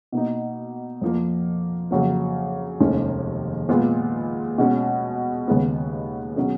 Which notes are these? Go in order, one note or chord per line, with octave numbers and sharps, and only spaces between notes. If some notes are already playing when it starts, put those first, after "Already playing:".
B2 A#3 D#4
F2 F3 A#3
F2 C#3 F#3 A#3
F1 D#2 D#3 G#3 C#4
A#2 G#3 B3 F4 G#4
B2 G#3 C#4
D#2 C#3 G#3 B3
B2 F#3 C#4 G#4